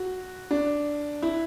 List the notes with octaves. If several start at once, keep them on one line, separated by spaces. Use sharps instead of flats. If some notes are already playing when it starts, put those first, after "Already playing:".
Already playing: F#4
D4
E4